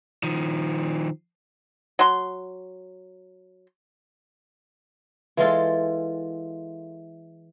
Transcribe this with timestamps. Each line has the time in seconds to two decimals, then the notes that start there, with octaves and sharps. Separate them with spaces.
0.23 D#3 F3
1.99 F#3 C6
5.37 E3 G#3 F4 A4